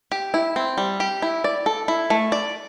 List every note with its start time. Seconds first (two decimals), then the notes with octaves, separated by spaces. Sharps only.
0.12 G4
0.34 E4
0.56 C4
0.78 G3
1.00 G4
1.22 E4
1.44 D5
1.66 A4
1.88 E4
2.10 A3
2.32 D5